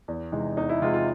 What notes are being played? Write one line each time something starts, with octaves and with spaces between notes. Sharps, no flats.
E2
C3 E3 G#3 D#4
E2 D#4
E4
C3 E3 G#3 F4
F4